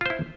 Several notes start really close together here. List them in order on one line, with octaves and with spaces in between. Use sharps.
F4 C5 E4